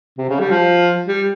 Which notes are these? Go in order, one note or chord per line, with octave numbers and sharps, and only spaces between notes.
C3
C#3
G3
F3
G3